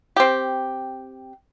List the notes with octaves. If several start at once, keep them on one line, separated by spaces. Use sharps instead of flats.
C4 G4